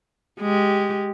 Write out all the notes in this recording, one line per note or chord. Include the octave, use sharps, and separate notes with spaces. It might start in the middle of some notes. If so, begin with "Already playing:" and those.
G#3 G4